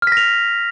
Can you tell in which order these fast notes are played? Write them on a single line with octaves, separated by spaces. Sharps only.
F6 B6 A#6 F7